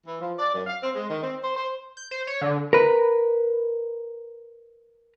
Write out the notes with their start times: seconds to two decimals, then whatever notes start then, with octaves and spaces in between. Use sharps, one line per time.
0.05 E3
0.20 F3
0.37 D5
0.53 F#2
0.66 F5
0.82 C4
0.93 G#3
1.08 D#3
1.22 C4
1.41 C5
1.55 C5
1.97 G6
2.11 C5
2.27 C#5
2.41 D3
2.73 A#4 B4